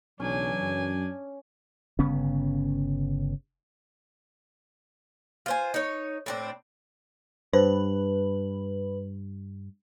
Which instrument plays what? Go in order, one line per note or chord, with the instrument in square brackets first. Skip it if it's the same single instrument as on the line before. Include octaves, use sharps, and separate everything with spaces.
[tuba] B1 [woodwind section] C#3 E3 F#3 [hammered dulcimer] C#4 [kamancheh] D4 G#5
[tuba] F#2
[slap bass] G1 C#3 B3 C#4
[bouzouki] F4 C5 G#5
D#4 C#5
A2 C4 D4
[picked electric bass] G2 [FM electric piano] B4 [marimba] C5